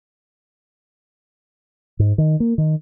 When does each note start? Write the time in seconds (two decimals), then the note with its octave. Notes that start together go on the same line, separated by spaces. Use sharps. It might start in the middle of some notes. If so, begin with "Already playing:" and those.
1.99 G#2
2.18 D#3
2.40 A#3
2.58 D#3